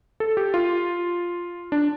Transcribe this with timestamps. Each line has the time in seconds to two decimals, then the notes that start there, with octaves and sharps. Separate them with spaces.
0.20 A4
0.37 G4
0.54 F4
1.72 D4